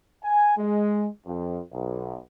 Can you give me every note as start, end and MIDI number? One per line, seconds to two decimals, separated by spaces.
0.24 0.53 80
0.58 1.07 56
1.26 1.60 41
1.72 2.16 35